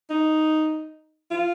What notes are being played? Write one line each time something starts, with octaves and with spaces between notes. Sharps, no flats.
D#4
F4